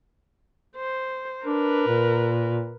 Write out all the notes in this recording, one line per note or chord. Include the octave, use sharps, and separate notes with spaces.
C5
D4 A#4 B4
A#2